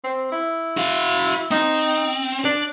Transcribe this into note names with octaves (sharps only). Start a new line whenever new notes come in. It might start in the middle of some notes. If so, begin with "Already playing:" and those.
C4
E4
F#4 F5
C4 D#4
D4 D5